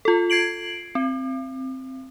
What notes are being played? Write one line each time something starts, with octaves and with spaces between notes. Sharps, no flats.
F4 A4
G#6 C7 D7 F#7
C4